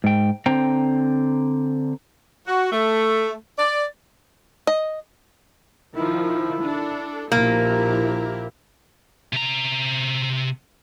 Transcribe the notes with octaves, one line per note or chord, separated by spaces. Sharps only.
G#2 G5
D3 C4 C5 G5 A#5
F#4
A3
D5
D#5
D#3 F3 E4
D4 A4
A#1 F3 A#3 E4 G4 A#4
C3 A#5